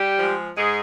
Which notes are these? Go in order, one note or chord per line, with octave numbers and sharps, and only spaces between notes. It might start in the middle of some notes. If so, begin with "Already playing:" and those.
Already playing: G3 G4
F3 G#3
G#2 G#3 G#4